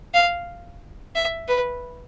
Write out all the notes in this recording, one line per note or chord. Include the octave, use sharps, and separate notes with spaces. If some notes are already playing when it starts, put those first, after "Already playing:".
F5
E5
B4